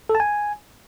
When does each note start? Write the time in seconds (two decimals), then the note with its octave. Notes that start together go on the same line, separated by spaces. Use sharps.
0.09 A4
0.15 A5
0.20 G#5